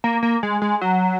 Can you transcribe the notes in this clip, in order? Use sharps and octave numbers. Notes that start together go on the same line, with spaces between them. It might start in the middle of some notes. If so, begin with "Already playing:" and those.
A#3
A#3
G#3
G#3
F#3